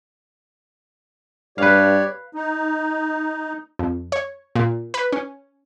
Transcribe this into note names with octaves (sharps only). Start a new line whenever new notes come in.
G2 G4 B4 C#5 D5 F5
D#4
F2
C#5
A#2
B4
C#4